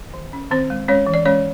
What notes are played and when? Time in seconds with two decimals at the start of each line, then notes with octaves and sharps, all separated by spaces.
0.14 D#3
0.33 C#4
0.51 D#3 C4 C5
0.70 G#3
0.88 G#3 C#4 C#5
1.07 E3
1.14 D5
1.26 G#3 C#4 C#5